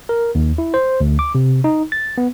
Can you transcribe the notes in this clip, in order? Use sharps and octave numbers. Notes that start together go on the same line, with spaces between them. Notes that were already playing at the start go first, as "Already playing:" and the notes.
A#4
D#2
E4
C5
D2
D6
C3
D#4
A6
B3